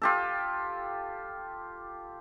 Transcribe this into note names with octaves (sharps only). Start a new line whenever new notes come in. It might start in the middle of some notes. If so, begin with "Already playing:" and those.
F4 G4 A4